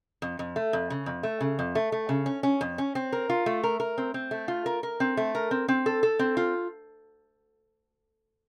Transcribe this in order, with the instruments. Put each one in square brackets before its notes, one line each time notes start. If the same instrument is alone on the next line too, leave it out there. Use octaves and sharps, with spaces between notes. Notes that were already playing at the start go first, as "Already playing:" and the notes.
[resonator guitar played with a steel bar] F2
F2
A3
F2
C#3
F2
A3
C#3
F2
A3
A3
C#3
C#4
C#4
F2
C#4
C4
A#4
F4
A3
A#4
A#4
C4
C4
A3
F4
A#4
A#4
C4
A3
A#4
C4
C4
A4
A4
C4
F4